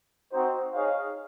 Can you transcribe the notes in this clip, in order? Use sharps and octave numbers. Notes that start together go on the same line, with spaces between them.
C4 D#4 F#4 C5
D#4 G#4 C#5 F5